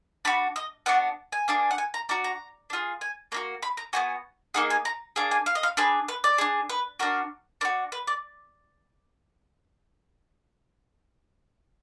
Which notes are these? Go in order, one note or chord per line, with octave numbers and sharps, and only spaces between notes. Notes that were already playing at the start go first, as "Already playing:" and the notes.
D4 F#4 B5
D#5
B3 D4 F#4 F#5
G#5
A#3 D4 G#4
F#5
G#5
A#5
D4 F#4 A#5
A#5
D4
F4 G#4
G#5
A#3 D4 F#4 A#5
B5
A#5
B3 D#4 F#4 G#5
A#3 D#4 G#4 F#5
G#5
A#5
A#3 D4 G#4
G#5
F5
D#5
F5
D4 G#4 B4
B4
D5
D4 G#4
B4
D4 F#4 A#4
D4 F#4 A#4
B4
D5